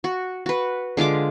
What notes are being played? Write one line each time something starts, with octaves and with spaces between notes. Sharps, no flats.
F#4
F#4 B4
D3 G#3 F4 D6